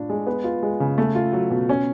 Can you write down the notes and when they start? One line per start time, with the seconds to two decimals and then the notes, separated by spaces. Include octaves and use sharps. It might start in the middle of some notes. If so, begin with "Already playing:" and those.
Already playing: A2 D4 F4
0.10 G#3
0.27 B3
0.44 F4
0.63 G#3
0.80 C#3
0.98 A3
1.15 F4
1.33 F#3
1.50 B2
1.69 C#4